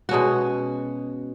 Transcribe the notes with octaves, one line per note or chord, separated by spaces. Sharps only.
B2 G#3 C#4 F#4